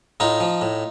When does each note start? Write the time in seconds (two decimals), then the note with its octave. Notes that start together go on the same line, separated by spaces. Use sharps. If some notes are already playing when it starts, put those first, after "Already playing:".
0.20 A2 D#4 F4
0.40 F3
0.61 A2